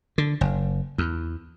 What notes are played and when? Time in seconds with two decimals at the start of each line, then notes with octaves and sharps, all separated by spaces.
0.18 D3
0.41 F#1
0.98 E2